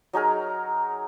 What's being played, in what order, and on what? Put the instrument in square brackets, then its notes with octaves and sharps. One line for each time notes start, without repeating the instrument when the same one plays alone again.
[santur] F#3 D#4 G#4 A#4